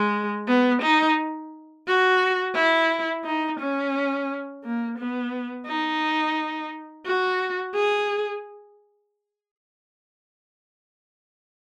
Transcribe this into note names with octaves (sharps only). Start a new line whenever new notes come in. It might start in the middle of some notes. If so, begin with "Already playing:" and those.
Already playing: G#3
B3
D#4
F#4
E4
D#4
C#4
A#3
B3
D#4
F#4
G#4